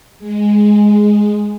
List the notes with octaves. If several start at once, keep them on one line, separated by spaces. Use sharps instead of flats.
G#3